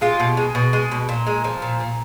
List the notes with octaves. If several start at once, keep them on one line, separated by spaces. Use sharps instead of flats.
G#3 F4 G4
B2
G#3
B2
G#3
B2
A#2
G#3
F3
A#2
A#2